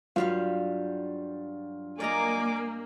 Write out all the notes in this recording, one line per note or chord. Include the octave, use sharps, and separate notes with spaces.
G2 F#3 G3 F4 F5
A#3 D5 D#5 G#5 A#5 D6